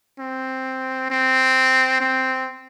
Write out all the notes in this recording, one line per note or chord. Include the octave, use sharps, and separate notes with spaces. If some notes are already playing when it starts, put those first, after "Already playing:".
C4
C4
C4